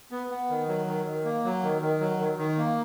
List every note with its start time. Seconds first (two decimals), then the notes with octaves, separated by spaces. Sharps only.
0.11 B3
0.30 B3
0.50 D#3
0.69 F#3
0.87 D#3
1.06 D#3
1.25 A#3
1.44 F#3
1.63 D#3
1.82 D#3
2.00 F#3
2.19 D#3
2.38 D#3
2.58 A#3